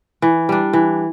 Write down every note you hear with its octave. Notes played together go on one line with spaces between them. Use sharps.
E3
G3 D4
E3